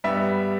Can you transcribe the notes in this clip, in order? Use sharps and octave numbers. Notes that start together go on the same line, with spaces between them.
G2 G3 B3 E5